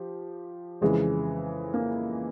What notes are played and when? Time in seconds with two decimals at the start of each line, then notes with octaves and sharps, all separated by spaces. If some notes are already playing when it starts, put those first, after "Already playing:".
Already playing: F3 G4
0.81 F2 C#3 E3 G#3
1.74 A#3